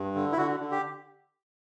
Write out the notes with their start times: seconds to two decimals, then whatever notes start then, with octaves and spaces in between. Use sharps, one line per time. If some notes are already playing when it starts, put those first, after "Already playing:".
Already playing: G2
0.15 D3
0.32 E4
0.37 D3 F#4
0.60 D3
0.71 G4